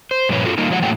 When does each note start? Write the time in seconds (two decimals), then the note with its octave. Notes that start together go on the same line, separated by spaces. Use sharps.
0.11 C5
0.29 G2 A#2 F3 C#4 B4 C#5
0.45 F4 F#4 A4
0.58 G3 A#3 D#4 F4
0.70 F3 F#3 G#3 E5 F#5
0.82 A2 F#3 A3 A#3 F#5 G5